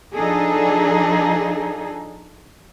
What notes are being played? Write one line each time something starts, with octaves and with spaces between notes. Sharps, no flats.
F3 D4 D#4 G#4 A4